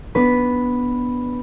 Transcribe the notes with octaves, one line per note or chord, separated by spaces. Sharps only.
B3 D4 B4